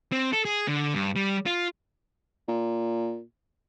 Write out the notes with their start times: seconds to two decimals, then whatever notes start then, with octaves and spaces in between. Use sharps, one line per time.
0.12 C4
0.33 A4
0.45 G#4
0.68 D3
0.95 G2
1.16 G3
1.46 F4
2.48 A#2